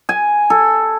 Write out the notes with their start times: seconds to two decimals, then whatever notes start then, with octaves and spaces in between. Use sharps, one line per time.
0.09 G#5
0.50 A4